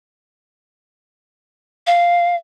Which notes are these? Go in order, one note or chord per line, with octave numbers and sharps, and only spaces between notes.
F5